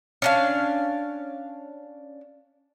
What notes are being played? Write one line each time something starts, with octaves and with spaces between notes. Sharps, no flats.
C#4 D4 F5